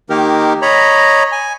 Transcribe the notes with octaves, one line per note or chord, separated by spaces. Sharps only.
D#3 A#3 D#4 G4 A#4
C#5 D#5 A#5 B5
G#5